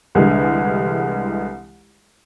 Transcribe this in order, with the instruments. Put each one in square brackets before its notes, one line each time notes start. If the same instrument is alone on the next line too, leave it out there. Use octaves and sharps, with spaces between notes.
[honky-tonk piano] C2 D3 E3 G3 G#3